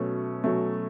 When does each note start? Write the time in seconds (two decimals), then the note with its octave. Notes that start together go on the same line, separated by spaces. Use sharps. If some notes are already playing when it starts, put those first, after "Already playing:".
Already playing: B2 F#3 A3 C#4
0.44 B2 F#3 A3 C#4